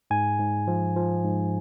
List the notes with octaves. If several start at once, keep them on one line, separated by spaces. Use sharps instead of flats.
G#2 G#5
G#2
F3
F3
G#2